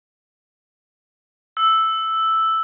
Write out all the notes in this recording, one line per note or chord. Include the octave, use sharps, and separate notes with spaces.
E6